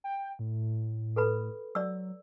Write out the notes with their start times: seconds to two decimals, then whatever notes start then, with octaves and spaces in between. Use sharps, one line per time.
0.04 G5
0.39 A2
1.16 A4 B4 B5
1.75 F#3 D5 E6